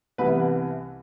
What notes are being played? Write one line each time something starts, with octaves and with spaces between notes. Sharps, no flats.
C2 C3 E3 B3 B4